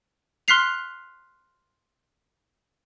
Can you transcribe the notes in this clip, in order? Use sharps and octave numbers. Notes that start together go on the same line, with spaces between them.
C6 F6 F#6 B6 C7 F7